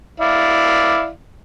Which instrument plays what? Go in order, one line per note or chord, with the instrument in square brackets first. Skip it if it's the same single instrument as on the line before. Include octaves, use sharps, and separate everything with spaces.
[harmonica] E4 D5 F5